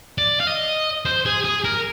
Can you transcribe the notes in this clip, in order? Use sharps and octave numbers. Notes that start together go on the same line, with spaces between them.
D5
F5
D#5
C5
G#4
G#4
A#4